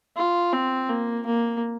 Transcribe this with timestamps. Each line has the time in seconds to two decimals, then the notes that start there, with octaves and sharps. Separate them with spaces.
0.17 F4
0.53 C4
0.89 A#3
1.26 A#3